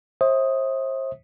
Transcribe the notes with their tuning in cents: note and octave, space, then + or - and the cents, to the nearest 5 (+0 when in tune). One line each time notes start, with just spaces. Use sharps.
C5 +35 E5 -25 D#6 +0